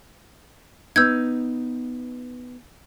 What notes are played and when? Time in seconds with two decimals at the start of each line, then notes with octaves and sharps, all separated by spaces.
0.96 B3 D#4 E6 G6 G#6